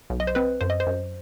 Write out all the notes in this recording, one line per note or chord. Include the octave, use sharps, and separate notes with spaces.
B1
D#5
C5
C4 B4
F#2 C5
D#5
C5
F#2